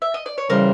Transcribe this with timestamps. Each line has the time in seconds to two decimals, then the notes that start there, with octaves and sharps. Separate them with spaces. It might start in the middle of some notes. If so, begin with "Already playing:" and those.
0.02 E5
0.14 D#5
0.26 D5
0.38 C#5
0.50 C#3 E3 G3 A#4 C5